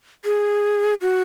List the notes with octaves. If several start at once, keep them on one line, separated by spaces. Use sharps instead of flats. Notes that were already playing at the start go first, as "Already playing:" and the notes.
G#4
F#4